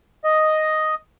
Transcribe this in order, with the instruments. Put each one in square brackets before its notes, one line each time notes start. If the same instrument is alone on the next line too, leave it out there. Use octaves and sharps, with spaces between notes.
[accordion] D#5